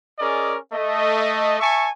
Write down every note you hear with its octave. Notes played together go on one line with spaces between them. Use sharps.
C#4 G#4 A#4 D5 D#5
A3 D#5
E5 G#5 A5 C#6